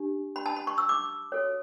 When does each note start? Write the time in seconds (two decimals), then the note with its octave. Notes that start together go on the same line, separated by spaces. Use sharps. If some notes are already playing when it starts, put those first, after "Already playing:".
Already playing: D4 G4
0.36 B5
0.46 A5
0.56 B5
0.67 C#6
0.78 E6
0.89 D6
1.32 F#4 A4 C#5